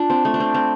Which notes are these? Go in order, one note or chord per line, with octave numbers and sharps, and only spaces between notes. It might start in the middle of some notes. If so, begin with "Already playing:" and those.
Already playing: D4 F4
C4
A3
D4
C4
C4